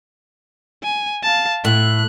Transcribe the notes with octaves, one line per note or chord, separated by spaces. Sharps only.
G#5
F5 A5
A2 F#6